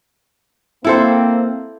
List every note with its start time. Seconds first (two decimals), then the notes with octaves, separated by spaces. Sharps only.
0.84 A#3 C4 E4 A4 C5